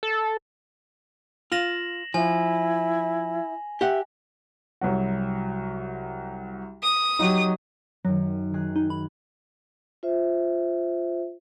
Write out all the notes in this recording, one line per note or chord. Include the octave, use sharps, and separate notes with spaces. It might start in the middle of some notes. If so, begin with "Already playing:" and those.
A4
F4 A#6 E7 F#7
F3 E4 G#5
G4 E5 F#5
C2 F#3 F#4
D#6
F#3 D#4 G4
F#2 D#3 F#3
D#3 G#4 F#6
D#4
B5
F4 C5 E5